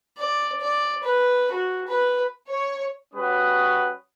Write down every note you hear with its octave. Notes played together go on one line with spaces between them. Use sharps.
D5
D5
B4
F#4
B4
C#5
G3 C#4 F#4 B4 D#6